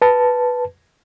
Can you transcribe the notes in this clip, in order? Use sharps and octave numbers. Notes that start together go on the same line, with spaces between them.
B4 A5